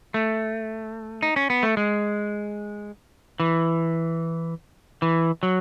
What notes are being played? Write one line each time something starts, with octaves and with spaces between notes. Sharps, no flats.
A3
D#4
C#4
B3
A3
G#3
E3
E3
F#3